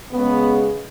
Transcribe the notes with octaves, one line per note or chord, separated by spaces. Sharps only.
C#3 G#3 B3